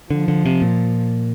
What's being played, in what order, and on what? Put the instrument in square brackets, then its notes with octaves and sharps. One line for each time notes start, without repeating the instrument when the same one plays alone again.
[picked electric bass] D3 [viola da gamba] F3
[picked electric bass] D3
C3
A#2